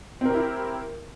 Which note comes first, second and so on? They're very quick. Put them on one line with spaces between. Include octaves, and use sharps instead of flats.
C4 A#4 G4 E4